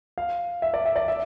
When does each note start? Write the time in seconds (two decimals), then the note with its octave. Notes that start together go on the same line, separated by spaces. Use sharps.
0.18 F5
0.62 E5
0.74 D5
0.85 E5
0.96 D5
1.08 E5